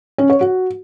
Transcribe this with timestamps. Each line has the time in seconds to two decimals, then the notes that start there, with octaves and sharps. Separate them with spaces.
0.18 C#4
0.30 C#5
0.41 F#4